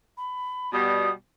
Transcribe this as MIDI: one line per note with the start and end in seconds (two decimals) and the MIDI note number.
0.17 0.70 83
0.73 1.10 47
0.73 1.10 55
0.73 1.10 87